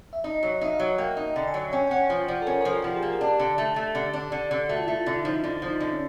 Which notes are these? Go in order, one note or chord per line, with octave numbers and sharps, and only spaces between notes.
E5
D#4 D#5
F#3
D#5
D#4 E5
F5
F#3
A#3 G5
D#4
D3
G#5
F#3
C#4 G5
G5
C#4 F#5
F3 C5
F3 D5
A4
C#4 A#4
F3 A#4
A4
F3 G4
G#4
A#3
G#4
D4 G4
D3
A3
A3
D3
D4
D3
D3
A3 F#4
F4
A3 E4
F4
D3 F4
E4
F3 D#4
E4
D3 D4
F3
D#4
D3
C#4